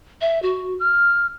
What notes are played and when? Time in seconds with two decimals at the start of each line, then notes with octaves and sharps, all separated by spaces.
0.21 E5
0.42 F#4
0.80 F6